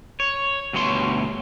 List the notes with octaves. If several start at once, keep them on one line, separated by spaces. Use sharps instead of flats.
C#5
D2 G2 B2 C#5 C6